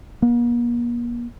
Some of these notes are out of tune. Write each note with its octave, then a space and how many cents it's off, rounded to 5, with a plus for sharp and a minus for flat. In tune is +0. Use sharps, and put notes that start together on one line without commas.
A#3 +40